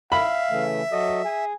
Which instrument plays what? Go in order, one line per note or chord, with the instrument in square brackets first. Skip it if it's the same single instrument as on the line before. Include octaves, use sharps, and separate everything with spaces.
[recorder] E5 [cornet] F5 [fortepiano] B5
[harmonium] C#3 E3 A3
[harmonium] F#3 F#4 A4 [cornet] D#5
[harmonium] G#4 [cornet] G#5